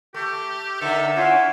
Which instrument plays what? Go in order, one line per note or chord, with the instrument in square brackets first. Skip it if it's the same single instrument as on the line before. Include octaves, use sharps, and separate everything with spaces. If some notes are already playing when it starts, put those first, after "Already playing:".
[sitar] A3 [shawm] G4
[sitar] D3 A#3 D#4 [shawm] A4 [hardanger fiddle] E5
[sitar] C#4 E4 [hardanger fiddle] F4 [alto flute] F#5 [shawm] G#5